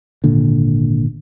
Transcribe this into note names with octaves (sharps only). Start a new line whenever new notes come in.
G#1 A#2 D3